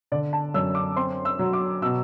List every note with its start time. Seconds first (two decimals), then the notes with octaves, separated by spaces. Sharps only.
0.12 D3 D5
0.33 A5
0.54 F#2 E6
0.75 D6
0.96 C4 C6
1.25 E6
1.39 F#3
1.53 D6
1.82 B2 E6